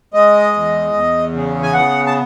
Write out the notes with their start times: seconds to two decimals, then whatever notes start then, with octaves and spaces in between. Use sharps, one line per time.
0.13 G#3 D#5
0.53 E2
0.93 E2
1.33 C#3
1.63 G#5
1.73 B3 F#5
2.06 A5